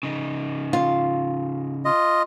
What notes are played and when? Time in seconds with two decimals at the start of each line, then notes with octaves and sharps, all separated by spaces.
0.03 C#3 D#4
0.73 F4
1.85 F4 D#5